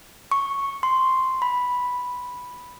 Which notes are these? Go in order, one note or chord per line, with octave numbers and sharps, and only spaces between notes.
C#6
C6
B5